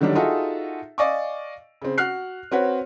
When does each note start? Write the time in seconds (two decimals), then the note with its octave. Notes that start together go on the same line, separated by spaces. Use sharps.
0.01 D3 D#3 F#3 G3 D4
0.15 D#4 F4 F#4 G#4 A4 E5
0.98 D5 D#5 F5 G#5 C#6 D6
1.82 C#3 C4
1.98 F#4 F6 F#6 C7
2.52 C4 F#4 B4 C#5